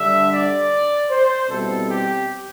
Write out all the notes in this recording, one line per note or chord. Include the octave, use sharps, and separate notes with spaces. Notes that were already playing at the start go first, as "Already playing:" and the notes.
Already playing: D3 G3 D4 E5
D5
C5
B2 G3 C4 E4 A4
G4